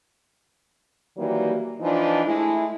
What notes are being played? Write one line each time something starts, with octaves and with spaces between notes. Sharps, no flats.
D#3 E3 F#3 G3 A#3
E3 F3 D4 D#4 F4
G#3 A3 E4